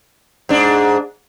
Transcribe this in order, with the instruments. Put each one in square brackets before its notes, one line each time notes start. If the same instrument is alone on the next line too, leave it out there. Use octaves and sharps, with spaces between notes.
[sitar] G#2 D4